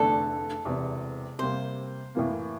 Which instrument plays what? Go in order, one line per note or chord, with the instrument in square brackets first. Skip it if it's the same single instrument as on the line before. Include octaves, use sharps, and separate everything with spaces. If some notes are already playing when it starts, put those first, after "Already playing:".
Already playing: [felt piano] F1 E2 D3 A3 D4 [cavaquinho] A4
[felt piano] E1 E2 C3
[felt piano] C3 G3 A#3 [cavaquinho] C5
[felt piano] A2 E3 A#3